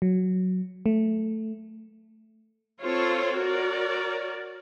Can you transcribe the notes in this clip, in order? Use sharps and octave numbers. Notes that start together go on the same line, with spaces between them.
F#3
A3
C4 F4 A4 C5 C#5
F#4 A#4 C#5 D5